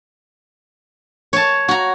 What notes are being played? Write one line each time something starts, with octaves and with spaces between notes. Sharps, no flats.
C#5 A5
F#4 A#5